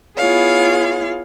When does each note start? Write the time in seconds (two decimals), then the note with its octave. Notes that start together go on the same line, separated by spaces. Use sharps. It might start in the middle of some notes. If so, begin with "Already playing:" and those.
0.17 B3 E4 F4 G#4 C#5 F5